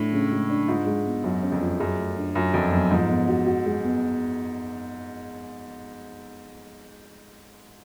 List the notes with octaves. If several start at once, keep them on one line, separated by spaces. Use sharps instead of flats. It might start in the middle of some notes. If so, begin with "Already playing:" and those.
Already playing: A2 D4
C#3
G#3
D4
G#2 F4
G#3
B3
F#2 F#3
C#4
F2
F4
F#2 G#4
A3
D4
F#2 F4
F2 F#3
F#2 B3
G#2 F3
B3
F#4
F#4
G#3
B3